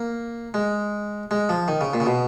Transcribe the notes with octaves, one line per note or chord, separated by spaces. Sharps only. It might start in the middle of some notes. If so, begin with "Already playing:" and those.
Already playing: A#3
G#3
G#3
F3
D#3
C#3
A#2
C#3
B2